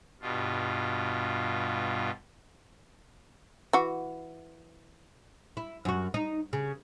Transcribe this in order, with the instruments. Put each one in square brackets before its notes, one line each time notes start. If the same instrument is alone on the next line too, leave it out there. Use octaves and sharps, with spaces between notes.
[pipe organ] G2 B2 F4
[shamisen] E3 F#4
[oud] E4
F#2 F#4
D#4
C#3